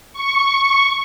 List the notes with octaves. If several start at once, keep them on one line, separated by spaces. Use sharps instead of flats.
C#6